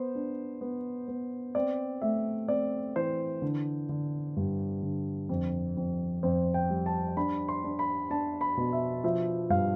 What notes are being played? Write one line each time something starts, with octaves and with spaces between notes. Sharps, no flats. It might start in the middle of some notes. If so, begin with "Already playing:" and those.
Already playing: B3 C5
D4
B3
B3
C4 D5
A3 E5
C4 D5
E3 C5
D3
D3
G2
D3
F2
F2
F2 C5
G5
G3
A5
D4 B5
C6
D4
B5
D4 A5
B5
B2
E5
F3 E5
G2 F5